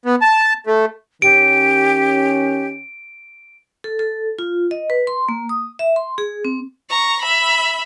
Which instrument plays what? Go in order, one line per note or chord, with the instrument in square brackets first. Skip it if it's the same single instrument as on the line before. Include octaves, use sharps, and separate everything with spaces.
[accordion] B3
A5
A3
[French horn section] D#3 C#4 [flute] G4 [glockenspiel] D7
[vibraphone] A4
A4
F4
D#5
B4
C6
A#3
D#6
E5
C6
G#4
C4
[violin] A#5 C#6
E5 B5